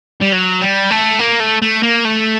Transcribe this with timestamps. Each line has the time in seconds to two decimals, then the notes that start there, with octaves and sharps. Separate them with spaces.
0.22 G3
0.33 F#3
0.62 G3
0.91 A3
1.19 A#3
1.40 A3
1.62 A3
1.83 A#3
2.05 A3